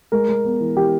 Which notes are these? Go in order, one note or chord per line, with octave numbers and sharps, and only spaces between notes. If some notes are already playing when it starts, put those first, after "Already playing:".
G#3 A#4
G#3
B3
E3
E3 G4